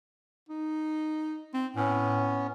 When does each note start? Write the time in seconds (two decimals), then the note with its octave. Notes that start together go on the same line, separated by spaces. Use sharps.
0.49 D#4
1.54 C4
1.76 A2 B3 C#4